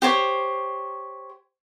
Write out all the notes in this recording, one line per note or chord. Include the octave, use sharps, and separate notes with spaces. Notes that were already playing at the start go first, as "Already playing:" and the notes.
G4 C5 C#5